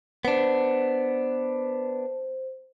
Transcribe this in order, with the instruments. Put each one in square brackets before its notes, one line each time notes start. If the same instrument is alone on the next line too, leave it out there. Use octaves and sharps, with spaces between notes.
[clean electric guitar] B3 D4 [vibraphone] C5